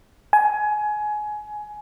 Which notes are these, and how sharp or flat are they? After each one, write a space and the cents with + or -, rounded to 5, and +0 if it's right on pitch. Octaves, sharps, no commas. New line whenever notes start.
G#5 +20